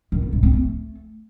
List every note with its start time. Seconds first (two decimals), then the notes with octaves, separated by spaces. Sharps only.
0.12 D#3
0.22 B3
0.33 G#2
0.43 C4
0.53 A3